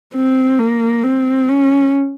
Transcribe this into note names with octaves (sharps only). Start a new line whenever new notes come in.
C4
A#3
C4
C#4